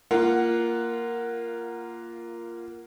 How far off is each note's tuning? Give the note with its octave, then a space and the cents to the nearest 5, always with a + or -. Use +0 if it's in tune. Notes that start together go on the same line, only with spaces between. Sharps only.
A#3 +0 F4 -15 F#5 +0